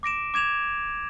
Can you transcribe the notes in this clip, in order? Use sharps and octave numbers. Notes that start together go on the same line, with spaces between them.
D6 A#6 D7 E7
D6 G#6 E7 F7